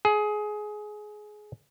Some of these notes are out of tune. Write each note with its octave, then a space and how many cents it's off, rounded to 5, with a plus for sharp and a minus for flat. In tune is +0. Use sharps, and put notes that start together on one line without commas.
G#4 +20